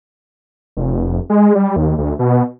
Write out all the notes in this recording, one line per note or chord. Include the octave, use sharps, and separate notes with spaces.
F1
G#3
G3
D#2
D2
B2